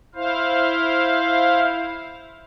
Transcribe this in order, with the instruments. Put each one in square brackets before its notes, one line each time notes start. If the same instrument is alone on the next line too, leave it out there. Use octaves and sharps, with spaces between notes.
[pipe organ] E4 C5 F5